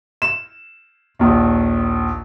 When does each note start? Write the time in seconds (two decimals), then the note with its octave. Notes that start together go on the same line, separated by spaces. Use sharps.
0.22 E7
1.19 A#1 D#2